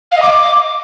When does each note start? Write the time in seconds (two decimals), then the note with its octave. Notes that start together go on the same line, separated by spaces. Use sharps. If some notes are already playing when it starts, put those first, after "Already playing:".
0.11 F5
0.17 D#5
0.22 D6